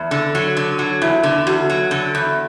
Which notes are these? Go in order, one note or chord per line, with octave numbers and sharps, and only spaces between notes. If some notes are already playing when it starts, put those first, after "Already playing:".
Already playing: E2
D3
F#3
D3
F#3
E2 E4
D3
E2 F#4
F#3
D3
E2